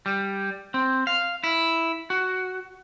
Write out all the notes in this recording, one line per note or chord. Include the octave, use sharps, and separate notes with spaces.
G3
C4
F5
E4
F#4